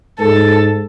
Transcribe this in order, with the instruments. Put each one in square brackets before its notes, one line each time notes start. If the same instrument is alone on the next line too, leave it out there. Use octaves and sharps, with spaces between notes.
[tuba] G#2 [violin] A4